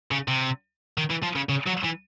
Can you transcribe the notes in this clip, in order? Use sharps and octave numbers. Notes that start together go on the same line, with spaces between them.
C#3
C3
D#3
E3
F3
C#3
C#3
F#3
E3